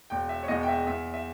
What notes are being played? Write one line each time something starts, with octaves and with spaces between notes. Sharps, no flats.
E1 G5
E5
C#5
E2 B2 G#3 D#5
G5
E5
E2 E5
E5